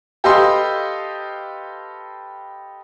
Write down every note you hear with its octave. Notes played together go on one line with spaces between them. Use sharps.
G4 A4 B4 D#5 F5 C6